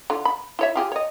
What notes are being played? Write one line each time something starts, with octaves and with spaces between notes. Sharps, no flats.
D3 F4
B5
E4 C#5 E5
F4 G4 G#4
C#5 D#5